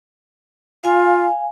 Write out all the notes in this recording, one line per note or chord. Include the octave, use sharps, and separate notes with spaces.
F4 F5 G#5